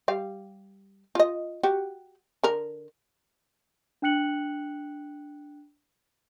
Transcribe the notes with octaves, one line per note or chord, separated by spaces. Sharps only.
G3 F5
F4 D#5
F#4 G4
D3 A#4
D4 G5 F#6 C#7 F#7